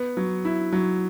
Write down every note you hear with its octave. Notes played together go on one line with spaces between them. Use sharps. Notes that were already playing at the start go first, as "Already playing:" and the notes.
Already playing: B3
F#3
E4
F#3